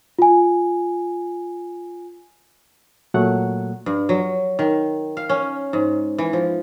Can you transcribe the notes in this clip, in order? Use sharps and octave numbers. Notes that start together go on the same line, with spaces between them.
F4 G#5
A#2 F#3 A3 F#5
G2
F#3
D#3
F5
C#4
G#2
E3
F3